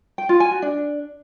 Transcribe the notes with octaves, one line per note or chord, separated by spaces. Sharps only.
G5
F4
G#5
F#4
D4